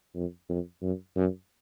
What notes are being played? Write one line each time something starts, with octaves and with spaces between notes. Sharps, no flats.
F2
F2
F#2
F#2